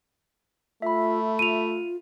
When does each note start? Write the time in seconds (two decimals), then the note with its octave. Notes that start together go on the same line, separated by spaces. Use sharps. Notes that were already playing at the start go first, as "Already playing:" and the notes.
0.82 A3 F4 E5 B5
1.39 F4 D#7 F7